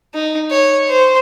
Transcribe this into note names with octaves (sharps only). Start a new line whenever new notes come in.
D#4
C#5
C5